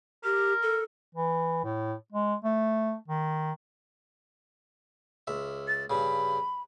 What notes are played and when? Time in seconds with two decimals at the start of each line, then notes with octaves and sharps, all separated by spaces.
0.24 G4 A#4
0.62 A4
1.15 E3
1.64 A2
2.12 G#3
2.44 A3
3.08 D#3
5.27 C#2 E5
5.67 A6
5.90 G2 C#3 B5